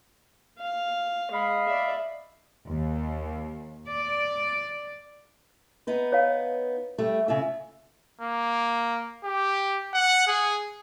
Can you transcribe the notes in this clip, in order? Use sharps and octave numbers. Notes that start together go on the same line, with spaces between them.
F5
G#3 D#5 F5 B5
D5 E5
D#2
D5
B3 D#4 B4
C#5 F5
G3 A3 G4
C#3 F4 E5
A#3
G4
F#5
G#4